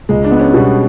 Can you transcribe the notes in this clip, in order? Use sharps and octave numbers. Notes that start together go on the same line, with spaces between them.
C#2 G#3
D4
B3
C#4
B2 G3